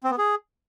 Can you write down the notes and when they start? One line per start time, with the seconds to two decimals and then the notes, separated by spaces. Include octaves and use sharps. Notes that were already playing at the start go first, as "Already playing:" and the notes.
0.04 C4
0.11 B3
0.18 G#4